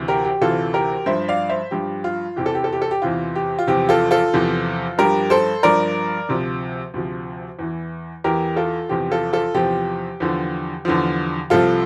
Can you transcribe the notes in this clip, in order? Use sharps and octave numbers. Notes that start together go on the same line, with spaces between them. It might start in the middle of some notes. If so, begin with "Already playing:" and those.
Already playing: D2 C3 E3
G4 A#4
G4
D2 C3 E3 F4 A4
G4 A#4
G2 F3 C5 E5
D5 F5
C5 E5
G2 F3 G4
F4
E2 C3 E3 G4
A4
G4
A4
G4
A4
G4
E2 C3 E3 F4
G4
F4
E2 C3 F3 G4
F4 A4
F4 A4
E2 C3 F3
G2 F3 G4 A#4
A4 C5
G2 F3 A#4 D5
D2 C3 F3
D2 C3 F3
E2 E3
E2 E3 G4 A#4
F4 A4
E2 C3 F3 G4
F4 A4
F4 A4
E2 C3 F3 G4
E2 D3 F3
E2 D3 F3
C2 C3 F3 F4 A4